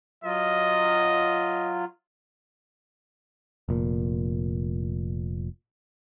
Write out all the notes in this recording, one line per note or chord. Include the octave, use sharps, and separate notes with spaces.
F#3 F4 D#5
F1 A#2